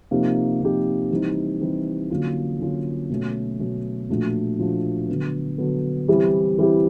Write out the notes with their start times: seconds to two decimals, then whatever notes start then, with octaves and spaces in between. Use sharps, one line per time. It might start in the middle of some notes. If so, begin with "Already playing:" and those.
0.11 C3 F3 A#3 D#4 G4
0.61 C3 F3 A#3 D#4 G4
1.11 E3 G3 C4 D#4
1.61 E3 G3 C4 D#4
2.10 D3 F#3 A#3 C#4 F4
2.60 D3 F#3 A#3 C#4 F4
3.10 B2 F#3 A3 C#4
3.59 B2 F#3 A3 C#4
4.10 A#2 F3 A3 D4 F#4
4.59 A#2 F3 A3 D4 F#4
5.09 D3 F#3 B3
5.58 D3 F#3 B3
6.08 E3 G3 C4 E4 G4
6.58 E3 G3 C4 E4 G4